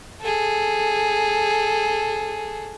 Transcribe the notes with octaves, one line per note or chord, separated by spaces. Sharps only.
G#4 A4